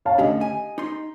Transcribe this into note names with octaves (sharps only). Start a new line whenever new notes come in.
C#5 F5 A5
A2 D3 C#4 G4 D#5
G#5
D#4 C6